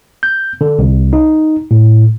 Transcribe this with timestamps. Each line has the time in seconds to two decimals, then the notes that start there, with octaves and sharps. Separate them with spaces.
0.23 G6
0.61 D3
0.79 C2
1.13 D#4
1.71 A2